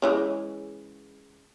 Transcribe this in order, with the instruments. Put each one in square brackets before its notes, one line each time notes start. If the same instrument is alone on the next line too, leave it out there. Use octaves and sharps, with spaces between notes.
[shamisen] C#3 E3 G#3